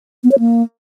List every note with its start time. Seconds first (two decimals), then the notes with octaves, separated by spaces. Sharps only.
0.24 B3
0.31 C#5
0.39 A#3